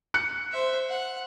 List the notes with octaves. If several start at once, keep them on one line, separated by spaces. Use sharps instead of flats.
F#6 C#7
C5 E5
F#5